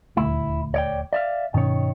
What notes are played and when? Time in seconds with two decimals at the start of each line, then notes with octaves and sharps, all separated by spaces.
0.17 D#1 D2 A3 E4
0.74 C#5 D5 G5
1.13 D5 E5 F5
1.54 G2 B2 D#3 C#4 C#5